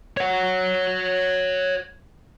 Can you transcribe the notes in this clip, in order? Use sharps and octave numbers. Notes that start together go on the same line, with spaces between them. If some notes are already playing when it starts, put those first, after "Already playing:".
C#5 F#5